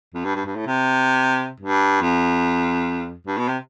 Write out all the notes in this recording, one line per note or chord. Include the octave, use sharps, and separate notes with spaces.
F2
G2
G2
G2
A2
C3
G2
F2
G2
B2
C3